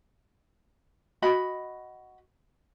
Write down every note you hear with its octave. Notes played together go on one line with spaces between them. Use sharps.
F#4 D#5 B5